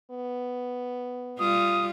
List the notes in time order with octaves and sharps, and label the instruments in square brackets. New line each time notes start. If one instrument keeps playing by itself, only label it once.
[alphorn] B3
[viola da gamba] G3 F4 [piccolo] D#6